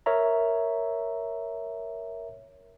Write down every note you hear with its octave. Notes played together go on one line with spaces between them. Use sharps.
A#4 C#5 E5 A#5